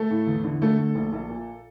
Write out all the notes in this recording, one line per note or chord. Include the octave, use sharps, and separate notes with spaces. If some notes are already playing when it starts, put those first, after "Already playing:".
Already playing: A3 A4
A2
E2
D3
D3 A3 A4
A3
A#1
A#1
A#2